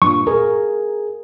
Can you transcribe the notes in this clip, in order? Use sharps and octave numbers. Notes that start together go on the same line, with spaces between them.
G2 A#2 C#6
G#4 A#4